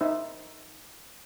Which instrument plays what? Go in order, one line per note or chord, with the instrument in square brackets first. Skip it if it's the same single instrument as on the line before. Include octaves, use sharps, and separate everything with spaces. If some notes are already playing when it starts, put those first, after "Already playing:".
[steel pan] D#4 C5 E5